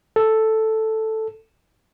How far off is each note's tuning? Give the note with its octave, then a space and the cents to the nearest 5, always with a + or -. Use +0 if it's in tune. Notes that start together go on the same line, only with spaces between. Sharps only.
A4 +0